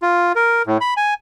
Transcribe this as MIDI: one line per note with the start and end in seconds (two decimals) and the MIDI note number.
0.02 0.32 65
0.35 0.62 70
0.66 0.78 45
0.81 0.94 83
0.97 1.14 80